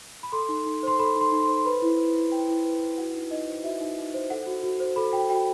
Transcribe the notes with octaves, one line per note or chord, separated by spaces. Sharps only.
B5
A4 C6
D#4
D#4
C5 C6
A4 B5
D#4
C6
D#4
C6
C5
C6
B4 B5
E4
B4
E4
B4 G5
E4
B4
E4
F#4 F#5
D#4
D#4 D#5
C5
F#4 E5
D#4
D#4
C5
A4 F#5
F#4
F#4
C5
A4 B5
F#4 G5
F#4 G5